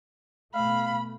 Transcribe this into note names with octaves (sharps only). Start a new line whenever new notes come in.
B2 A3 F5 B5